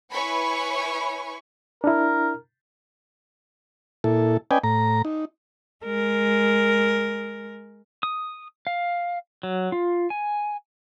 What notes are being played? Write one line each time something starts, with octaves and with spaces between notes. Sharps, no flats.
E4 B4 C#5 G#5 B5 C#6
D4 E4 A#4
A#2 E4 A4
C#4 B4 D5 D#5 G5 G#5
A2 A#5
D#4
G#3 A#4
D#6
F5
F#3
F4
G#5